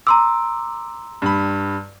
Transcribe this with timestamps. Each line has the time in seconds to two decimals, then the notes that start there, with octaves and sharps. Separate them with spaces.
0.07 A#5 C6 D6 E6
1.22 G2 B5